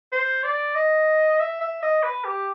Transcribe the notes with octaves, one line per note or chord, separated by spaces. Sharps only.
C5
D5
D#5
E5
E5
D#5
B4
G4